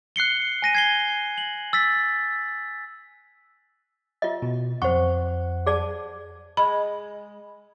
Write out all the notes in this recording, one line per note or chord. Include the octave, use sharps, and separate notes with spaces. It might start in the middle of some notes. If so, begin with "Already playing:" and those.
F#6 C7 C#7 G7
G#5 A#6 D#7
G#6 C7 G7
F#7
E6 A6 B6
F4 D#5 E5
B2
F2 C5 F#5 C#6
G#4 D5 A5
G#3 B5